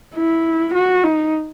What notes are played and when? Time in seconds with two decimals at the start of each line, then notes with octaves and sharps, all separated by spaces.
0.15 E4
0.75 F#4
1.04 D#4